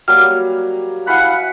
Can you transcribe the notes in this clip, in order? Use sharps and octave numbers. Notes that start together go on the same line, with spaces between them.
F#3 G3 A#3 F6
E4 F5 F#5 G#5 B5